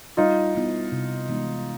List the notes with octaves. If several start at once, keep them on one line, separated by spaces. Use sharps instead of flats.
G3 D#4 F4
B3 E4
C3
E3 G#3 B3 D#4